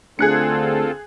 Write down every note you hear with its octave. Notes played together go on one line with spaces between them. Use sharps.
D2 D3 C4 F4 G#4 A4 F#6 C#7